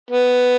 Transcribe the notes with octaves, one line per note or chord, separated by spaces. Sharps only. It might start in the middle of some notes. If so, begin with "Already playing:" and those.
B3